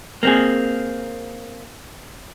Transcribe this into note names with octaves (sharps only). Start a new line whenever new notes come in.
A#3 C4 G#4